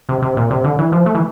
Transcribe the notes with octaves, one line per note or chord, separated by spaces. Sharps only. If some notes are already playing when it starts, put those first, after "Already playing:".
C3
C3
A#2
C3
D3
E3
F3
A3
E3